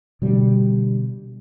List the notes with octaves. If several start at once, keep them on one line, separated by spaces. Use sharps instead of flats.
B2 D3 G3